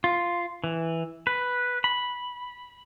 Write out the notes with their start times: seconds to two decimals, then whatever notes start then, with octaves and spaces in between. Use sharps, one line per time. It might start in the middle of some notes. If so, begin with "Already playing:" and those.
0.04 F4
0.64 E3
1.27 B4
1.84 B5